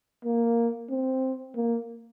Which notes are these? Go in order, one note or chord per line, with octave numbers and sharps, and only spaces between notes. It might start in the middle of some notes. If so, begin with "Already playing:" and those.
A#3
C4
A#3